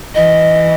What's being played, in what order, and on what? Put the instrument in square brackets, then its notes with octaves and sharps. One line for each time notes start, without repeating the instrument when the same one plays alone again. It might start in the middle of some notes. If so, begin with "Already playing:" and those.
[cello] E3 [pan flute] D#5